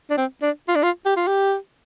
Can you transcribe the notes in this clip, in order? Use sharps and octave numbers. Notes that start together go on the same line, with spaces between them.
D4
C4
D4
F4
D4
F4
G4
F4
G4